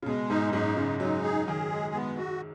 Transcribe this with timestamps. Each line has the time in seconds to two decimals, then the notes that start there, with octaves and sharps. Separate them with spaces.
0.02 C#3
0.06 B2 G#3
0.30 G#2 D#4
0.50 F#2
0.53 G#2 D#4
0.77 C#3 G#3
1.00 F#3 D#4
1.24 G#4
1.48 D#3 G#4
1.71 G#3
1.94 B3
2.17 F#4